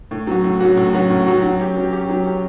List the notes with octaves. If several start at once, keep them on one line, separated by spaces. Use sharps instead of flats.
A2
F#3 C#4 F#4
A2
F#3 C#4 F#4
A2
F#3 C#4 F#4
A2
F#3 C#4 F#4
F#3
C#4 G4
F#3
C#4 G4
F#3
C#4 G4